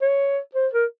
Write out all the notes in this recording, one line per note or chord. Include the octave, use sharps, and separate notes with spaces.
C#5
C5
A#4